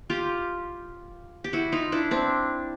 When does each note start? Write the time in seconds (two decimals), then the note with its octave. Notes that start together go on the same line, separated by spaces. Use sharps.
0.10 F4 G4
1.44 G4
1.53 E4 F#4
1.72 D#4 F4
1.92 D4 E4
2.11 C4 D4